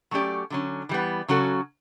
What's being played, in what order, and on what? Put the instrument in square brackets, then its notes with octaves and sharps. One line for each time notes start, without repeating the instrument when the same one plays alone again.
[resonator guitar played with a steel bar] F#3 A3 C#4 G4 D5
D3 F#3 C#4
E3 G3 B3
C#3 F#3 C#4 F#4 A4